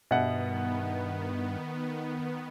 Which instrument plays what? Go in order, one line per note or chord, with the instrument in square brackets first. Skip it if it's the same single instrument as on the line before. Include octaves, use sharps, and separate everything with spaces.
[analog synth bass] G2 [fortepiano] B2 [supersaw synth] D#3 B3 [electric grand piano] E5 F#5